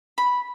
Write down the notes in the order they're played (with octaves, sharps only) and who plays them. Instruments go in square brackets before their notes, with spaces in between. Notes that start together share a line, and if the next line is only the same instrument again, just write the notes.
[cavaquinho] B5